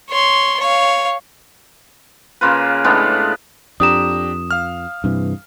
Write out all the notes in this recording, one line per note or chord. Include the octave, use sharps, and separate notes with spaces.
C#5 C6
C#5 F5
C#3 A#3 F4 B4
A2 G#3 B3 D4
F2 D4 G4 A#5 D#6 E7
F5 F6
G2 C3 E3